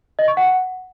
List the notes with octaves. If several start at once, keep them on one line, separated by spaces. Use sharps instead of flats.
D#5
C#6
F#5